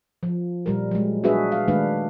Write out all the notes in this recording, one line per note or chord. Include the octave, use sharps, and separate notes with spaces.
F3
A#2 G3 A#4
F#3 G#3
B3 D4 F#4 G#4 B4 E5
F5
D#3 G#3 A3 D4 B4 F5